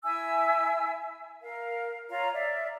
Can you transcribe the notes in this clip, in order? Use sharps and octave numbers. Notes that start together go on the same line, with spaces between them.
E4 E5 G#5 E6
A#4 F5
F4 C#5 F5 A#5
D5 E5